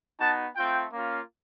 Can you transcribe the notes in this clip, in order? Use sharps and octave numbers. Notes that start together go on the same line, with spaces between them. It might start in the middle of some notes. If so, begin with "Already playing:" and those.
B3 D#4 F#4 A5
A3 C4 F4 G5
A#3 C#4 F4